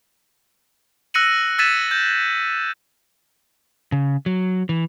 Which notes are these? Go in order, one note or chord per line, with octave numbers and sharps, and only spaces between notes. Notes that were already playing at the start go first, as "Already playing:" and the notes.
E6 F#6 A#6 C#7 D#7 F#7
E6 G#6 A6 B6 D#7 E7
G6
C#3
F#3
E3